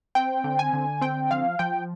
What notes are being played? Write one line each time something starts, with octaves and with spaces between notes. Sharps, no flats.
C4 G5
D3
G#5
D3
C4 G5
F3 F5
F3 G5